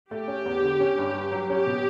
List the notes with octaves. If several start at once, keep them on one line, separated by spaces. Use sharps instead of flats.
A3 G4
C#4
E2
D3
C#4
G2
G2
F#3
C#4 G4
B2